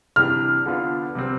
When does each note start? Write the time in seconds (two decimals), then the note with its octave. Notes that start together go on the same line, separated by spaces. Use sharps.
0.16 C3 E3 G3 D4 G4 F6
0.66 D3 F3 B3 D4 F4
1.15 C3 G3 C4